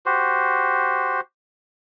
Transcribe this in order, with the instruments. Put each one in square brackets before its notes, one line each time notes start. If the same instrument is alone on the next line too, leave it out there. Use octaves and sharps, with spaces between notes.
[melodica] F#4 G4 C5